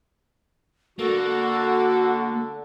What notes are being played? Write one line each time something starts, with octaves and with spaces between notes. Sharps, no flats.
D3 A#3 F#4 A4